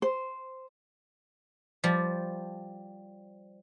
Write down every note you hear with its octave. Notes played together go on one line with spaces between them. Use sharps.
C5
F3 G3